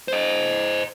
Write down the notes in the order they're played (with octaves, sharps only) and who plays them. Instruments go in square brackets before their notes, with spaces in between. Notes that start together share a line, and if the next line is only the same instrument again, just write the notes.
[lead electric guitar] C5 D#5